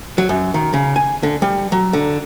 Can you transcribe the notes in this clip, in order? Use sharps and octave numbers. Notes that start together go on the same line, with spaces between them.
F#3
F#2
D#3
C#3
G#5
D3
G3
F#3
D3